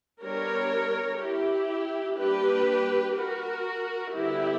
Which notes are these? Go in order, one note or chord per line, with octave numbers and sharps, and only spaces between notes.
G3 B3 D4 A#4 C#5
E4 G4
G3 A#3 D4 G4 B4
F#4 A#4
D3 G3 B3 E4 G4